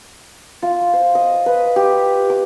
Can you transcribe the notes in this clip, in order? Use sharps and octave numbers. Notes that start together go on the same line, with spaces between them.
F4
C5
D#5
B4
G4
D6